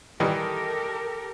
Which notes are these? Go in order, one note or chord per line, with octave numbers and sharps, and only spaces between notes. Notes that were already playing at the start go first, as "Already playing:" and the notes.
D#3 E3 G3 G4 A4 A#4